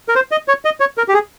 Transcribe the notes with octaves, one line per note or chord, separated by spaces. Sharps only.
A#4
C5
D#5
C#5
D#5
C#5
A#4
G4
G#4